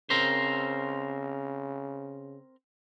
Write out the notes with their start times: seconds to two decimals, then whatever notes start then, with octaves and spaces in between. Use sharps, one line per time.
0.10 C#3 C4 A#4 C5